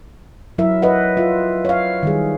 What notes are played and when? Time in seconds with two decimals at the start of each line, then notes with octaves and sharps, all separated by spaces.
0.58 F#3 E4 A#4 E5
0.82 B4 D#5 F#5
1.17 F4 E5
1.65 C#5 F5
2.03 D#3 G3 G#4